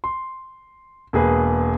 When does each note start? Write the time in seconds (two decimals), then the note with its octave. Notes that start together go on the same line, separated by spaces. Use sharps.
0.04 C6
1.13 E1 A#3 G#4 B4